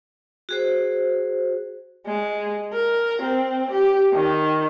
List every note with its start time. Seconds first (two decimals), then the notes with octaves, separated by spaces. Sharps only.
0.49 F#4 G#4 C5
2.07 G#3
2.73 A#4
3.22 C4
3.72 G4
4.13 D#3